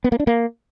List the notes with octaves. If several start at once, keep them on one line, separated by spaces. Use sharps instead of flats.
B3
A#3
D4
A#3